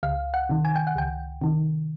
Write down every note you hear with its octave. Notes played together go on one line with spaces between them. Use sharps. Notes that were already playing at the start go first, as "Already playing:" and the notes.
C#2 F5
F#5
C3 D#3
G#5
G5
F#5
C#2 G5
C3 D#3